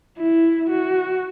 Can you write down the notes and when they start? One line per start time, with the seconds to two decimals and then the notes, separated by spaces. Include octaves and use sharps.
0.18 E4
0.69 F#4